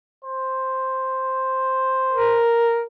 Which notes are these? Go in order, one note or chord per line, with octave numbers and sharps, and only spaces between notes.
C5
A#4